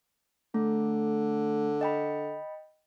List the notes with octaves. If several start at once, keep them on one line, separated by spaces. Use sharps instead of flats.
D3 A3
D#5 G5 B5